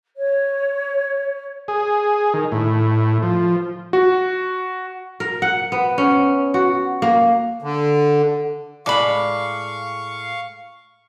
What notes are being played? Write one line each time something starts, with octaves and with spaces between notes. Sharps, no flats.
C#5
G#4
D#3
A2
F3
F#4
A#4
F#5
B3
C#4
F#4
A#3
D3
A2 G#3 D5 F5 B5 C#6 D6